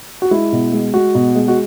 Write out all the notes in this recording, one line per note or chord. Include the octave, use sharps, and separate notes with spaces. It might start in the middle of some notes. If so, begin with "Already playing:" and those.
F#4
G#3 E4
B2
G#3
G#3 F#4
B2
G#3
F#4